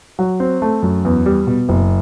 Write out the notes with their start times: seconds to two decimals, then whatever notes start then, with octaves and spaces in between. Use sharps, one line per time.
0.19 F#3
0.40 C4
0.62 A3
0.83 F#2
1.05 E2
1.26 G3
1.47 B2
1.69 F#1